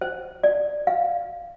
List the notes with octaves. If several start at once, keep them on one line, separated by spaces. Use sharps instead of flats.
C5
D5
F5